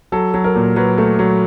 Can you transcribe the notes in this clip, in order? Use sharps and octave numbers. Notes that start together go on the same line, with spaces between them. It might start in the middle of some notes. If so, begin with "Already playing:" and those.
F#3 A4
F#3
A#4
A#2
F#3 B4
A3
F#3